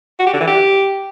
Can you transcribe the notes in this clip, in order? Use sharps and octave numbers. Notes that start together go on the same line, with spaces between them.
F#4
G4
D3
E3
G4